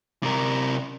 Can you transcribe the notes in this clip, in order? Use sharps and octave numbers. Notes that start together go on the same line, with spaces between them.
C3 A#4